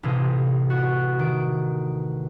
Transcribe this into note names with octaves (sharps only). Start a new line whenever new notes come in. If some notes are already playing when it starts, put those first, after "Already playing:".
A1 C3 F4 G#4
F#4
D#3 D7